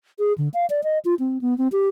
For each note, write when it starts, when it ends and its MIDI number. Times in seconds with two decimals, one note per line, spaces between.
0.19 0.33 68
0.38 0.49 50
0.54 0.66 77
0.70 0.81 74
0.84 0.98 75
1.05 1.15 65
1.19 1.38 60
1.41 1.56 59
1.58 1.68 60
1.72 1.88 67